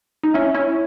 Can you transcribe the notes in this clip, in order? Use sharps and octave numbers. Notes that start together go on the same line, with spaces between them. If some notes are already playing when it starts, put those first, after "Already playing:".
D#4
C#4 E4
C#4 E4